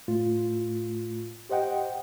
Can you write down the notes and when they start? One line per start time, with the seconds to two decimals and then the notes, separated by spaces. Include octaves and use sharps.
0.08 A2 A3 F4
1.49 G4 C5 D#5 F#5 G5